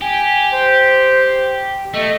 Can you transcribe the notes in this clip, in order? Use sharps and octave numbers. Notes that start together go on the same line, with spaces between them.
G4 G#5
C5
A3 D#5